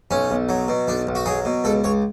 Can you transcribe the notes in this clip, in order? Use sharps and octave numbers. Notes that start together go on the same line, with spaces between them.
B1 C#4
B1
F#3
B2
B1 D4
B1
F#4
F#3 G#4
B2
C#2 A4
C#2 C#5